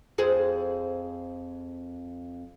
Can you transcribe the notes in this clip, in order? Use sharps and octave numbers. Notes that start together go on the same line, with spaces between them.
F2 G#4 C5